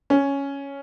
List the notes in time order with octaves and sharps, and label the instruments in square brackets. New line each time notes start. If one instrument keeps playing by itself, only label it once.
[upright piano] C#4